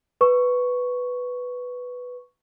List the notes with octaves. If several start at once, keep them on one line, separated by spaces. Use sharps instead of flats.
B4 C#6